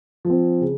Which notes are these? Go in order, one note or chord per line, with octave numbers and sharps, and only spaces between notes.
F3
C4
C#3